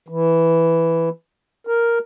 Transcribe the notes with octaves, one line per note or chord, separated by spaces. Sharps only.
E3
A#4